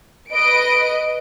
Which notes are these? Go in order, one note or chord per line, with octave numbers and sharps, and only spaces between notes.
B4 D#5 D7